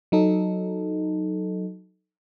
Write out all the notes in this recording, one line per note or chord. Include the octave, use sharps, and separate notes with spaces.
F#3 D#4 A4